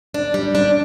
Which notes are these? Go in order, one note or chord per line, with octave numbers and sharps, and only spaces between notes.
D4
G3
D4